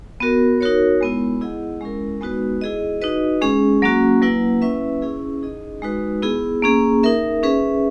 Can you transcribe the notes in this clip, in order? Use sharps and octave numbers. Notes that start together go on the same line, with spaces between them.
B3 F#4 A#4
D#4 F#4 A#4 C#5
G#3 B3 E4
E4 G#4 D#5 F#5
G#3 C#4 E4 A#4
G#3 B3 D#4 F#4 B4
E4 G#4 D#5
D#4 F#4 B4 D#5
G#3 C#4 G#4
F#3 A#3 C#4 F#4
F#3 A#3 E4 B4 F#5
C#4 E4 B4 E5
C#4 E4 G#4
D#4 G#4 D#5
G#3 D#4 F#4 B4
B3 E4 G#4
A#3 C#4 G#4
D#4 A#4 E5
C#4 G#4 B4 E5